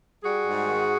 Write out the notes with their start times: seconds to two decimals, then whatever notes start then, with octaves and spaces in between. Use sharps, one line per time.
0.24 G3 F#4 G#4
0.46 G#2
0.66 D#3